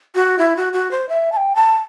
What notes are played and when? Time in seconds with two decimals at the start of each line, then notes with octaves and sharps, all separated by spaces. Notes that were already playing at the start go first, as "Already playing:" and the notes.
0.15 F#4
0.39 E4
0.57 F#4
0.73 F#4
0.91 C5
1.09 E5
1.32 A5
1.37 G5
1.55 A5